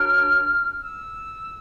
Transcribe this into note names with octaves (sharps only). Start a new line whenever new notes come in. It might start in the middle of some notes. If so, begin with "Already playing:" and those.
Already playing: D4 F#4 A#4 C#5 F6
E6